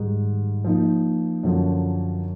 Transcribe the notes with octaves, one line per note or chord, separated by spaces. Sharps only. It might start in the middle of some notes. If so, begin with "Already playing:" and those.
Already playing: G#2 D#3 G3
F3 A#3 D#4
F#2 D3 F3